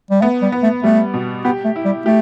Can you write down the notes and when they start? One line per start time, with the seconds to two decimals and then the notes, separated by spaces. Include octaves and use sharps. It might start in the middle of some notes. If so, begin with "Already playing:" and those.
0.10 G3
0.22 A3 B3
0.42 G3
0.52 B3
0.63 A3
0.83 G3 A3
1.14 B2
1.45 B3 G4
1.65 A3
1.76 E4
1.85 G3
2.06 A3 G4